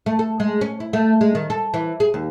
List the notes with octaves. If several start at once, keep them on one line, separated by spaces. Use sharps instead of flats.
A3
A4
G#3
C#4
E4
A3
G#3
D#3
A4
E3
G#4
D#2